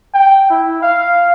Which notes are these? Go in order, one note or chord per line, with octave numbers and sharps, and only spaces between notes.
G5
E4
F5